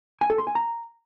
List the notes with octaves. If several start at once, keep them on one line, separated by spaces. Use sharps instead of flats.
G#5
A4
C6
G#5
A#5